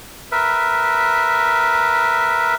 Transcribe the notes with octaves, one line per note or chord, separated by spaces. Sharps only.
A#4 B4 E5